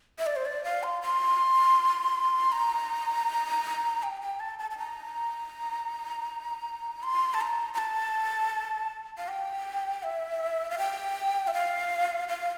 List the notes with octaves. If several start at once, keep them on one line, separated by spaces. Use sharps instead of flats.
E5
D5
C5
D5
F5
C6
C6
A#5
G5
G5
A5
A5
A5
A#5
C6
A5
A#5
A#5
A5
F5
G5
E5
F5
G5
E5
F5
F5